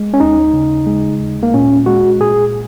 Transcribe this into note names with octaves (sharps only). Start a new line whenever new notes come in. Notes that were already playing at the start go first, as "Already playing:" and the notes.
Already playing: G#3
C#4
D#2 D#4
C#3
G#3
D#2
A#3
A#2 C#4
G#3 F#4
A#2 G#4